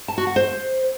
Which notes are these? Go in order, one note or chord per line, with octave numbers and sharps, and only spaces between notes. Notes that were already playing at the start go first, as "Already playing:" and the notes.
A5
F#4
F#5
C5